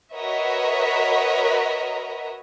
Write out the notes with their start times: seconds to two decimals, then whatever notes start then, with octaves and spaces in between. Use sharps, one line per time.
0.13 F#4 A#4 B4 C#5 D#5 E5